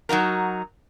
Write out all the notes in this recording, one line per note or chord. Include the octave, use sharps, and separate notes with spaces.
F#3 D#4 F#4 A#4